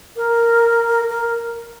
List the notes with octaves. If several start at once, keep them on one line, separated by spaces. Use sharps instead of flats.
A#4
A#4